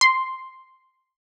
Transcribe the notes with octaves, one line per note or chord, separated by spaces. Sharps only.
C6